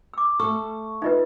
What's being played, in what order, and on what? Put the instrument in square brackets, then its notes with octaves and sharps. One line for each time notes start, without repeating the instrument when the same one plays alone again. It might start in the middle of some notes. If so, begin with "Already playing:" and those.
[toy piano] D6 E6
[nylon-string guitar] A3 A4 [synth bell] C#6
[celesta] D#4 F4 B4 [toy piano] D#5 E5